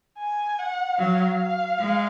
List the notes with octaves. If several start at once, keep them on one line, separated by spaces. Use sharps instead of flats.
G#5
F#5
F#3 F5
G#3